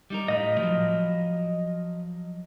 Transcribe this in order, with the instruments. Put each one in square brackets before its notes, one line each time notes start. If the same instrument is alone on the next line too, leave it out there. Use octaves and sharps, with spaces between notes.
[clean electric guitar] G3 D#4 A#4
[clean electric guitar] A2 [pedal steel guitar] D#5 F5 B5
[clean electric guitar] F3 F#3